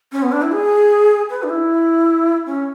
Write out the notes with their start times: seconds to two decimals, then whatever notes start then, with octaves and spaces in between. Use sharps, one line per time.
0.12 C#4
0.22 B3
0.32 D4
0.42 E4
0.52 G#4
1.30 B4
1.43 D4
1.49 E4
2.46 C#4